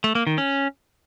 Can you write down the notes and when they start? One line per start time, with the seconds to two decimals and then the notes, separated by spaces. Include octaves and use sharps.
0.04 A3
0.15 A#3
0.27 D#3
0.38 C#4